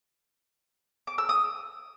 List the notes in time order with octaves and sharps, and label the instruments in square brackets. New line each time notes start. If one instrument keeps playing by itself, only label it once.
[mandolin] D6
E6
D#6